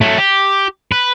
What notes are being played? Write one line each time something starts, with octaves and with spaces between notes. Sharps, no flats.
F#3 A3
G4
B4